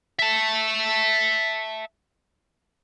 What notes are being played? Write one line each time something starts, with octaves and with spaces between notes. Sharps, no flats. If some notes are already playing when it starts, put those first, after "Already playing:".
E5 A5